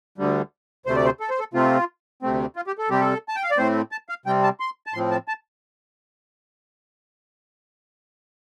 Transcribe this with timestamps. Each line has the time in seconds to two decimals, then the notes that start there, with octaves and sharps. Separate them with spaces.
0.18 D2 D3 G3
0.86 D2 C3 A3 C5
0.96 D5
1.05 C5
1.20 A4
1.30 C5
1.39 A4
1.54 C3 A3 C4 F4
2.22 D2 C3 A3 C4
2.56 F4
2.67 G4
2.78 A4
2.90 C3 G3 C4 G4
3.01 A4
3.29 A5
3.36 G5
3.43 F5
3.51 D5
3.58 A2 A3 C4 C5
3.92 A5
4.09 F5
4.26 C3 G3 C4 G5
4.43 A5
4.60 C6
4.86 A5
4.94 A2 F3 C4 C6
5.11 A5
5.28 A5